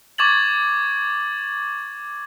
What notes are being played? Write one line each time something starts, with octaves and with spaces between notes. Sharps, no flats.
C#6 D6 G#6 A6 F#7